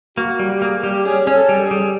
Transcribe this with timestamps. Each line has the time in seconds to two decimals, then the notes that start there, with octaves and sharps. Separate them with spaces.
0.17 A#3 F#4
0.39 G3
0.57 G4
0.61 A#3 G#4
0.83 G3 G4
1.05 C#4 G#4
1.27 C#4
1.34 A4
1.49 G3
1.64 G#4
1.71 G3